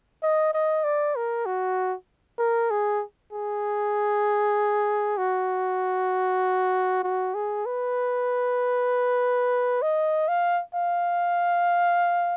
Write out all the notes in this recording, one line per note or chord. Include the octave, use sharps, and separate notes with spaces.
D#5
D#5
D5
A#4
F#4
A#4
G#4
G#4
F#4
F#4
G#4
B4
D#5
F5
F5